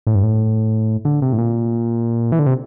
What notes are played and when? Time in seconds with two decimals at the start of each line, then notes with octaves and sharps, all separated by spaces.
0.07 A2
0.15 G2
0.23 A2
1.05 D3
1.22 C3
1.33 A2
1.38 A#2
2.32 E3
2.39 D3
2.46 C3